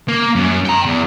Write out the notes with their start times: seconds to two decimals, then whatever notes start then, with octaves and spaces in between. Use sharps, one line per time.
0.08 A#3
0.35 F#2
0.65 G5 A#5
0.85 E2